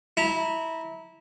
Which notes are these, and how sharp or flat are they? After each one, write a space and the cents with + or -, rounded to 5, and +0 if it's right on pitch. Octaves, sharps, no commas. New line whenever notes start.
E4 -20 A#5 -25